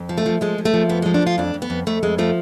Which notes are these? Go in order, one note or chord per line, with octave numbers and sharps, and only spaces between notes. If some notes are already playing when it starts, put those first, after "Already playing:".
Already playing: F2
F3
A3
F3
F3 G#3
F3
A3
F3
F2 B3
F3 G#3
D4
F2 F4
F2 D4
F2
B3
F2
F2 A3
F2 G#3
F3 A3